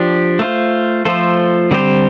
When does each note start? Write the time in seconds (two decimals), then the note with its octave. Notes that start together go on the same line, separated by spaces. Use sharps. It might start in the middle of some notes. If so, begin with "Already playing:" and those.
Already playing: F3 D4 G4
0.39 A3 F4 C5
1.05 F3 A3 F4 A4 C5
1.71 D3 G3 C4 G4 C5